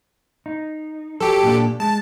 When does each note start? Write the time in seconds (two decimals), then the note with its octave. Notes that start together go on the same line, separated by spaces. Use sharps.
0.46 D#4
1.20 F#3 G4 A4
1.43 A#2 D4
1.80 G#3 A5